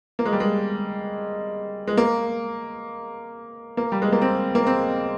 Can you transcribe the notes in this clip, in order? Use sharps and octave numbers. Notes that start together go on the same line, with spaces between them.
A#3
G#3
G3
G#3
G#3
A#3
A#3
G3
G#3
A#3
C4
A#3
C4